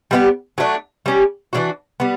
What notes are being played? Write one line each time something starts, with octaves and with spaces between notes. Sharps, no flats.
G3 B3 E4 G4
F#3 A3 D4
G3 C#4 G4
E3 G3 D4 F#4
G3 B3